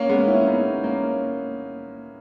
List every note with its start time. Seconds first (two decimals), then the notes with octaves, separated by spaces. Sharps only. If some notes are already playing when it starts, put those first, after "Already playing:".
Already playing: A#3 C#4
0.09 G#3 B3
0.28 C#4 E4
0.47 B3 D#4
0.83 A#3 C#4